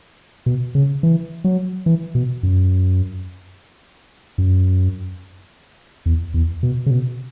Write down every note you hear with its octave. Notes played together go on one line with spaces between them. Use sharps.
B2
C#3
E3
F#3
E3
B2
F#2
F#2
E2
E2
B2
C#3
B2